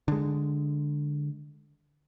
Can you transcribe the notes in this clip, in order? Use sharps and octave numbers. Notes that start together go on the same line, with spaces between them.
D3 G#3